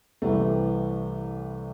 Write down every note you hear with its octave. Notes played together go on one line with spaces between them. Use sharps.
C2 C3 E3 G3 A3